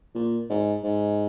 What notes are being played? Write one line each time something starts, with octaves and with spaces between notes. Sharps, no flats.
A#2
G#2
G#2